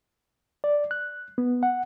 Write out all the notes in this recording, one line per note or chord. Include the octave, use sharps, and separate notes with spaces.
D5
F#6
B3
F#5